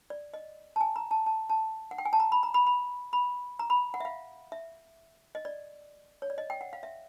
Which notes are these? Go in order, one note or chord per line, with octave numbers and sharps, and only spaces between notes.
D5
D#5
A5
G#5
A#5
A5
A5
A5
F#5
G5
G#5
A5
A#5
B5
A#5
B5
B5
B5
A#5
B5
F#5
E5
F5
E5
D#5
D5
C#5
D5
D#5
G5
F#5
F5
E5